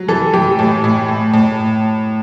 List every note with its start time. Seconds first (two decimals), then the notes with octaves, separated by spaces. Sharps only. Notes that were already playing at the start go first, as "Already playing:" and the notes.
Already playing: F#3
0.08 E3 A4
0.34 E3 G4
0.59 A2
0.84 A2
1.08 A2
1.33 A2